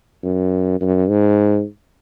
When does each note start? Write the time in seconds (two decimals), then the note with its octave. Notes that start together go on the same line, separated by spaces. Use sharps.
0.23 F#2
0.80 F#2
1.09 G#2